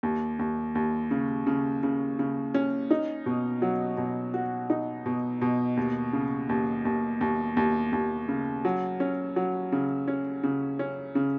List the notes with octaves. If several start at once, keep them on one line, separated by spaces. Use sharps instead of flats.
D#2
D#2
D#2
C#3
C#3
C#3
C#3
C#4
D#4
B2
F#3
B2
F#4
D#4
B2
B2
D#2
C#3
D#2
D#2
D#2
D#2
D#2
C#3
F#3
C#4
F#3
C#3
C#4
C#3
C#4
C#3